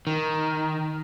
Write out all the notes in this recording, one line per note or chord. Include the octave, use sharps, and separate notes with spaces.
D#3